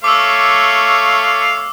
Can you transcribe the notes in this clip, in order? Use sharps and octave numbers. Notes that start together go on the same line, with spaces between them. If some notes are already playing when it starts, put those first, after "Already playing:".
A3 C#5 F5 D6 E6